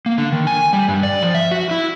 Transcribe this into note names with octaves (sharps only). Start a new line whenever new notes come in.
A#3
D3
D#3
G#5
G3
G2
D5
F3
E5
F#4
E4